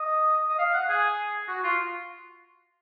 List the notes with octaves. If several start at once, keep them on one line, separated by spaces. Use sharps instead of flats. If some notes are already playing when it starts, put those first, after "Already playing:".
Already playing: D#5
D#5
F5
F#5
G#4
F#4
F4